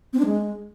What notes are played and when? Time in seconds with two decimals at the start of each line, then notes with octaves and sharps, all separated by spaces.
0.13 C4
0.19 D4
0.25 G#3